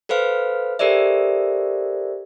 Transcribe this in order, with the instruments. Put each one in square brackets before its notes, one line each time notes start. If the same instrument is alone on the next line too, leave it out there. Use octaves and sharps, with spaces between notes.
[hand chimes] A4 B4 C5 F5 F6
G4 A4 A#4 C5 D5 E5